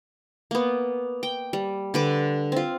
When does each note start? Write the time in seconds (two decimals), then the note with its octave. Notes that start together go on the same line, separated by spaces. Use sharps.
0.51 A#3 B3
1.23 G5
1.53 G3
1.94 D3 B4 D6
2.52 C4 F4